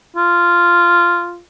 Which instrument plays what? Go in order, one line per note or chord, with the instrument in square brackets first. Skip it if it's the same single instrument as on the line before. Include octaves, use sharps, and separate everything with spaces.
[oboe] F4